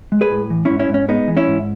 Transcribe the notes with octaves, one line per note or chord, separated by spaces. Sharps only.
G#3
G#4 B4
A2
E3
G#2 C#4 E4
C#4 E4
G#2
C#4
G#3 B3 D#4
E3
C#4 E4
G#2